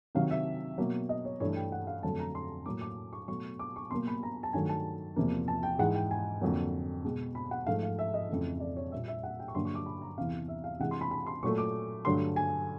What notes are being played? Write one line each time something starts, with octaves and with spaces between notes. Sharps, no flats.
C3 D#3 F#3 F5
E5
B2 F#3 A#3
D#5
C#5
G2 E3 A3 C#5
G5
F#5
F5
F2 D3 F#3 A3 A5
A#5
C6
A2 F#3 A#3 D6
D6
C#6
B2 F#3 A3 C#6
D6
C#6
B2 F#3 A#3 C6
B5
A#5
A5
G2 D#3 F#3 A3 G#5
A5
E2 C3 F3 A#3
A5
G5
G#2 E3 G#3 F#5
G5
G#5
F2 D3 F#3 A#3
B2 G#3
B5
F#5
G#2 F3 A3 F5
F5
E5
D#5
F2 C#3 E3 A3
D5
C#5
A#2 G3 A#3 E5
E5
F#5
G5
C#6
G2 D3 F#3 A#3 C6
C#6
D6
B5
A#5
E2 C3 E3 F5
E5
F5
C3 E3 G#3 F#5
C6
B5
B5
C6
A#2 F#3 A3 C#6
D6
G2 D3 F#3 A3 C6
G#5